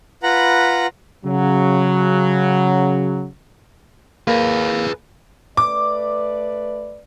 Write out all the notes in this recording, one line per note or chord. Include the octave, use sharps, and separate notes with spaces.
F4 B4 F#5 A#5 B5
C#3 F#3
A#3 G#4 B4
A3 B4 D5 D6